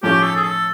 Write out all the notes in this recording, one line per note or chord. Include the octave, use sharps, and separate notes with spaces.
A2 F3 A3 C#4 G4
A4
G#4
A4